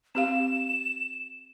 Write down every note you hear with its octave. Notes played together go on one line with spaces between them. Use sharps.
C4 G4 F5 E7